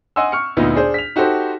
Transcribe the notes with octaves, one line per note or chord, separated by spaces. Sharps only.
D#5 F#5 G#5 C6 E6
C#6 F6 C#7
D2 A#2 B3 D#4
D4 G#4 C5
B6 F7
D#4 F#4 G4 A4 C5